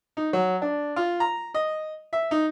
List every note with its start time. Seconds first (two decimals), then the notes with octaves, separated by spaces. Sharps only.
0.17 D#4
0.33 F#3
0.62 D4
0.96 F4
1.20 A#5
1.54 D#5
2.13 E5
2.31 D#4